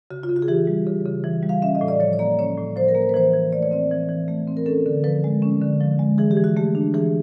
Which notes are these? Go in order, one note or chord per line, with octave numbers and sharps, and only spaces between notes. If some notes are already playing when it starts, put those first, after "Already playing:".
C#3 F#4
F4
C#3
F#4
G#4
E3 G4
G3
C#3
C#3
E3
G3
F5
C#4 E5
D#5
A2
D5
F3 C#5
C#5
A#3 D5
C#4 C#5
A2
F3 C5
A#4
A#3
C5
B4
E3 C5
E3
A3 D5
C#5
C4 D5
E3
E3
A3
C4
A#4
C#4 A4
D3
F3 B4
G#3
C#4
D3
F3
G#3
E3 G#4
G4
E3
F#4
A3 G4
D4
E3 G#4